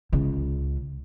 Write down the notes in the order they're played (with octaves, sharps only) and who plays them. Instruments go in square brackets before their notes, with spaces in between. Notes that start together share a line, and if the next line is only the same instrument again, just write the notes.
[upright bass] C#2 C#3